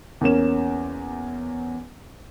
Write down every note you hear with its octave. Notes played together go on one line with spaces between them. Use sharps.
E2 A#3 C#4 E7